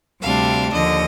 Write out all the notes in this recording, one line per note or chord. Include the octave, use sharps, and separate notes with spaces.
D2 C3 G3 D4 F5
D#2 D3 F3 D#5